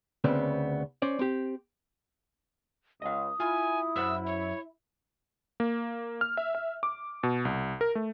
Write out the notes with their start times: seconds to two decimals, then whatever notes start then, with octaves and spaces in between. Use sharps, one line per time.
0.24 D2 C#3 B3 C4
1.02 C#4 C5 D5
1.19 C4 G4
3.02 C#2 D#5 F5 D#6
3.40 E4 F4 G#5
3.96 F#2 C5 F#5 E6
4.26 C#5
5.60 A#3
6.21 F6
6.37 E5
6.55 E5
6.83 D6
7.23 B2
7.45 C2
7.81 A#4
7.95 A3